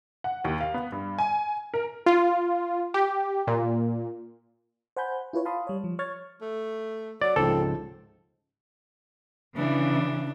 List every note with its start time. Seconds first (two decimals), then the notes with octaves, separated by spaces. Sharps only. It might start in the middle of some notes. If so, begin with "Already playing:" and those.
0.24 F#5
0.45 D#2
0.61 F5
0.74 B3
0.92 G2
1.19 G#5
1.74 A#4
2.06 F4
2.94 G4
3.47 A#2
4.97 C5 F#5 G#5 B5 G6
5.33 E4 F4 B4 C#5
5.45 F5 A5 B5 C6 D#6
5.67 G3 C#5
5.84 F3
5.99 C#5 C#6 F6 G#6 A6
6.42 A3
7.22 F#3 D5
7.36 C#2 G#2 F3 C4 A4
9.57 C#3 E3 D4